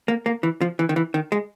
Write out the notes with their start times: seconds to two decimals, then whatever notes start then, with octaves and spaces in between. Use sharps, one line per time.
0.08 A#3
0.26 A#3
0.43 E3
0.61 F3
0.79 E3
0.89 D#3
0.96 E3
1.14 D#3
1.32 G#3